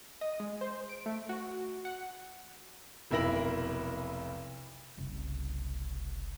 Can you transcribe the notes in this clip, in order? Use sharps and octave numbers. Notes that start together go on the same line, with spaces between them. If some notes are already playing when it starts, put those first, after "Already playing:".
D#5
G#3
C5
D7
A3
F#4
F#5
F1 B1 E4 A#4 A#6 F#7
F#1 C2